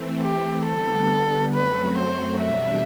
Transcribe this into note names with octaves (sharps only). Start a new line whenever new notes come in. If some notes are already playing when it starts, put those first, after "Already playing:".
Already playing: E3 A3 C4
G4
D3 G3 B3 A4
F#2 F#3 A3 C4 F#4 B4
C5
E2 B2 G3 D4 E5